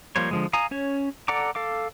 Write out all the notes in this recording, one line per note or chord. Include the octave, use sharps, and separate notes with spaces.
F3 G3 A#3 C5 C#5
D3 F3 G#3
F5 G#5 A#5 D#6
C#4 C#5
A4 D5 F#5 A#5 D6
A4 F5 D6